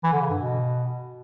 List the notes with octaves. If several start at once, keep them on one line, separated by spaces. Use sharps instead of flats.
E3
D3
C#3
G2
B2